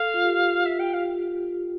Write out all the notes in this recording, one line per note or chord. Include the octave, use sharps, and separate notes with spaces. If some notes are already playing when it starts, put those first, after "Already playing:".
Already playing: A4 F5
F4
G4
E5
G5
F5